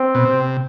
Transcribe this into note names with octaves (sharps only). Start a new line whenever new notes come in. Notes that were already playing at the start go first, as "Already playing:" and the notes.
Already playing: C4
B2
C3